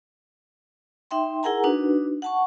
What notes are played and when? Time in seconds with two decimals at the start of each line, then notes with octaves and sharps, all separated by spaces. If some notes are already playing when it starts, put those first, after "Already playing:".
1.11 D#4 E5 G5 C6
1.43 E4 G#4 A#4 F#5 G#5 A#5
1.64 D4 D#4 F#4 B4
2.22 F#5 A5 C#6